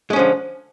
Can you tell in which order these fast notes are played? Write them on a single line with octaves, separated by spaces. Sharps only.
G#3 C#4 F3 D3